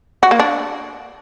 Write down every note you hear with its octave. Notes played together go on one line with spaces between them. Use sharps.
F#4
A#3
D4